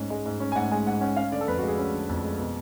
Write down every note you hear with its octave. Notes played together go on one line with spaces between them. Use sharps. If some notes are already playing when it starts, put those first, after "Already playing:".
Already playing: G#2 C#4
G#3
G#2
C#4
G#5
G#2 F#5
G#3 G#5
G#2 F#5
C#4 F#5
C#4 F5
D3 D5
A4
F2 B4
F#4
G#3
G#4
C#4
D3
F2
G#3
B2